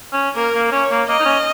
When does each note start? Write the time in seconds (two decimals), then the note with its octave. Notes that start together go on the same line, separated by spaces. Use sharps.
0.12 C#4
0.36 A#3 A#4
0.54 A#3
0.72 C#4 C#5
0.90 A#3
1.08 A#3 D#5
1.19 D#4
1.25 C#4